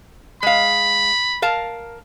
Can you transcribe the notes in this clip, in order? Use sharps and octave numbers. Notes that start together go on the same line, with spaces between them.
G#3 F5 B5
A#4 F5 A5